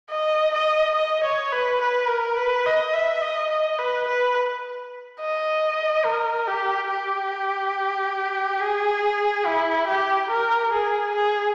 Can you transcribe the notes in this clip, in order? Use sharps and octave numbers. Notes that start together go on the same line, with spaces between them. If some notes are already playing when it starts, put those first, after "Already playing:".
D#5
D#5
D#5
C#5
B4
B4
A#4
B4
D#5
E5
D#5
D#5
B4
B4
D#5
A#4
G4
G4
G#4
E4
G4
A#4
G#4
G#4